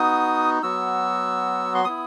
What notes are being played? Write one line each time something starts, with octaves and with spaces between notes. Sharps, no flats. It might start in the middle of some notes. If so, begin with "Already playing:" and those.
Already playing: B3 D#4 F#4 D#6
F#3 B3 F#4 E6
C6
B3 E4 D#6